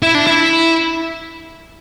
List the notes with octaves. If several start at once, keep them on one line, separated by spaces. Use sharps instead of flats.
E4
D4
E4